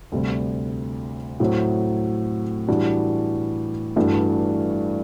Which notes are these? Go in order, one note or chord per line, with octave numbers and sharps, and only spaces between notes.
D2 C3 G3
A2 F#3 C4
A2 E3 G3 D4 F#4
G2 E3 A3 D4 F#4